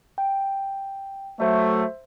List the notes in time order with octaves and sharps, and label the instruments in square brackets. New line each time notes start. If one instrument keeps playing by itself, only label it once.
[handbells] G5
[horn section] F#3 A3 [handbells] C5 E5